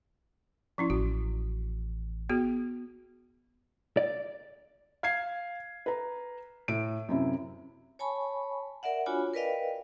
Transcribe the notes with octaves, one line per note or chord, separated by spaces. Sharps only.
F3 C#4 E4
A1 F#4
B3 F#4 G#4
D5
F5 G#6 C7
B4 A#5
A2 D7
F#2 C3 E4
C#5 G#5 A5 B5 C#6
A#4 D5 E5 F#5
D4 F4 F#4 C#5 G#5 B5
A#4 B4 D5 D#5 F5 G5